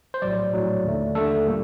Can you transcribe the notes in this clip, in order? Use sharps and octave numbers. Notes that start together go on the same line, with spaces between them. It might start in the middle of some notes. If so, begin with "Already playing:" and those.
C5
A#1 A2 F#3 D5
A#1 A2 F#3
D#2 D3 A3
D#2 D3 A3 A4
A#2 G3 A#3